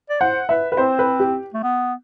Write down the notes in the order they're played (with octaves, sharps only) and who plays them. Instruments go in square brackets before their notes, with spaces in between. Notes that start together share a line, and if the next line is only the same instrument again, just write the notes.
[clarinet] D5
[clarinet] C5 [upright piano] F#5
[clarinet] B4 [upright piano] E5
[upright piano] B4
[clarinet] C4 [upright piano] C5
[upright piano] B4
G4
[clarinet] A3
B3